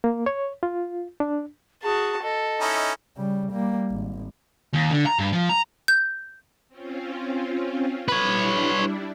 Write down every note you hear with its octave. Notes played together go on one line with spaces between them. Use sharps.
A#3
C#5
F4
D4
F#4 G#4 A5
A4 D#5
C#4 D#4 E4
C#3 G3
G3 A#3
G#1
D#2
D3
A#5
G2
F3
A#5
G6
C4 C#4 F4
G3 D4 E4 B4 C#5